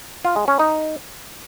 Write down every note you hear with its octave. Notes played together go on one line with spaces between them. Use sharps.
F4
G#3
C#4
D#4